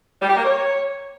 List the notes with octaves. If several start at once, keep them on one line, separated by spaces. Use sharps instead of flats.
G3
G4
A#3
C#5